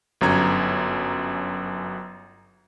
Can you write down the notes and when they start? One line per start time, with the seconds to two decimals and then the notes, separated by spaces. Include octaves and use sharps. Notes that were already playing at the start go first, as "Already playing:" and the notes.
0.21 G1 F#2 A#5 G#6